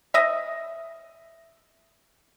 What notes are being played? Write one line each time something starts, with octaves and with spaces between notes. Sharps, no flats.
D#5 E5